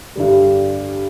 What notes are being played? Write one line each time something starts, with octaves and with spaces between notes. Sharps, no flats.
G2 D3 G3